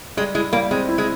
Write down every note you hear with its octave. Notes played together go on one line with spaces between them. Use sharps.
G3 G#3
G#3 E4
G3 A#3
G#3 C4
E4
G#3